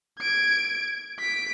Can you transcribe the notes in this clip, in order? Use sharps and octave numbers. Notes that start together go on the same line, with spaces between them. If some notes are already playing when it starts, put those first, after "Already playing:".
G#6 D7
B6 D7